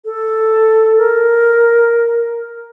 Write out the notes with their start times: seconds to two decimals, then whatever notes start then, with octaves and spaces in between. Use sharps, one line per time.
0.05 A4
0.97 A#4